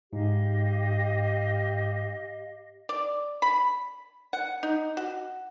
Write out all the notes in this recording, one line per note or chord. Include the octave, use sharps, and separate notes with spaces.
G#2 G4 D#5 F5
D5
B5
F#5
D#4
F#4